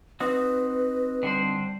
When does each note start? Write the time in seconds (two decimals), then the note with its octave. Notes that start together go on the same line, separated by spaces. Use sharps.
0.20 C4 D#4 F#4 B4
1.23 D3 G3 D4 C5